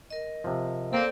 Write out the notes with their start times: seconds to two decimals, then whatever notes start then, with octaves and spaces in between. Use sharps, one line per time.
0.10 A#4 D#5
0.44 C3 F3
0.93 A#3 C4 A4 D5